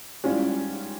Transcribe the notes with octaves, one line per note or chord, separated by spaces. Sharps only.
G#2 E3 G3 C#4 F4